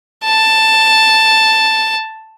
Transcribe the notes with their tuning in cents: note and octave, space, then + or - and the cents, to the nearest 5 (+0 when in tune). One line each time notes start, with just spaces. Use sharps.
A5 +5